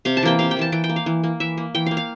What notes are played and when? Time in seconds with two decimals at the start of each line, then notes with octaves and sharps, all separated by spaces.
0.05 C3 F5
0.17 A5
0.23 E3 A#3 G5
0.39 C3 F5
0.51 G5
0.57 E3 A#3 A5
0.72 E3 G5
0.84 G5
0.89 A#3
0.96 F5
1.06 E3
1.24 A#3
1.40 E3 E5
1.57 A#3
1.75 E3 G5
1.86 A#3 F5
1.97 F5